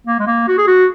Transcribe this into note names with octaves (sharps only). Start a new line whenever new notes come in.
A#3
G#3
A#3
F#4
G#4
F#4